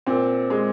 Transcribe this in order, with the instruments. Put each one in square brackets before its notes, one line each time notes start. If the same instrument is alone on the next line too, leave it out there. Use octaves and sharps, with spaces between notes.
[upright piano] A#2 C4
G#3